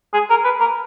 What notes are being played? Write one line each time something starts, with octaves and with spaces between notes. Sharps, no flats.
G#4
A#4
B4
A#4